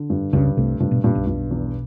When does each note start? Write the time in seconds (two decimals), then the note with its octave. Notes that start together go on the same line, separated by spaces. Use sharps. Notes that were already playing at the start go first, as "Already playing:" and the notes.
Already playing: D3
0.10 G2
0.33 C#2 G2 C#3
0.56 C2 C3 A3
0.80 G2 C3
0.91 B2
1.04 G2 A#2
1.15 B1 B2
1.27 G2
1.51 E2